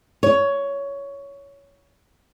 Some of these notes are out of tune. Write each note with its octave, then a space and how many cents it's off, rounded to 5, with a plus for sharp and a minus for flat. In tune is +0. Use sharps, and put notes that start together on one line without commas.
C#5 +10